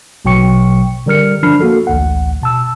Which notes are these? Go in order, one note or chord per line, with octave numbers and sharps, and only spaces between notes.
A#1 B2 F#3 G5 C#6 C#7
D3 G3 A#4 F6 C#7
F3 D4 B5 F6 C7
A#3 F#4 A4
A1 D2 F#5
B2 A5 E6